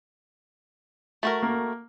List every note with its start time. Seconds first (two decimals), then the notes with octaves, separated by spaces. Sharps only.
1.23 A3 F#4 A#4
1.43 A#3